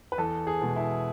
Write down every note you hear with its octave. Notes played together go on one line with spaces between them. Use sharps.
B4
E2 A4
G#4
B2 G#3
E4